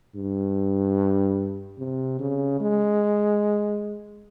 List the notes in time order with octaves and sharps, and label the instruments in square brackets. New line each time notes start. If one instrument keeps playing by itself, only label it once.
[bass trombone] G2
C3
C#3
G#3